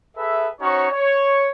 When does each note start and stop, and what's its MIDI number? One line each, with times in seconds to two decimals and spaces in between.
0.17 0.49 68
0.17 0.49 69
0.17 0.49 71
0.17 0.49 76
0.60 0.86 61
0.60 0.86 63
0.60 0.86 66
0.60 0.86 72
0.60 0.86 73
0.91 1.50 73